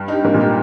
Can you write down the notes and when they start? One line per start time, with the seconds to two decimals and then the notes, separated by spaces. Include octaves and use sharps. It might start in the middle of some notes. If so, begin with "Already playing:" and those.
Already playing: G2
0.08 D#4 G4
0.24 G#2 A#3
0.34 A#2
0.40 D#4 G4